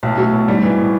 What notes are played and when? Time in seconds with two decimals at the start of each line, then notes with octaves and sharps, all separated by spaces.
0.03 B1 A2
0.18 F#3
0.33 B2
0.48 G#2 G3
0.63 E3
0.78 A2